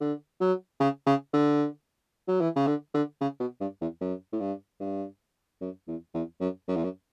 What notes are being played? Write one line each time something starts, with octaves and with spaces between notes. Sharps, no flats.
D3
F#3
C#3
C#3
D3
F#3
E3
C#3
D3
D3
C#3
B2
G2
E2
F#2
A2
G2
G2
F#2
E2
E2
F#2
F#2
E2
F#2